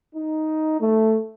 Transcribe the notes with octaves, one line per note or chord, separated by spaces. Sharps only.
D#4
A3